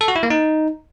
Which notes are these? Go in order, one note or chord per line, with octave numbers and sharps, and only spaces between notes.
A4
F#4
E4
A#3
D#4